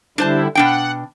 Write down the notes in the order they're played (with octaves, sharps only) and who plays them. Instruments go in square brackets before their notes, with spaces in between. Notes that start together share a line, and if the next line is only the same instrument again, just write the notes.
[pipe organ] D3 G3 E4 [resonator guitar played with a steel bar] D4 C5 A5
[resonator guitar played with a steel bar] B2 D4 G5 [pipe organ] F#5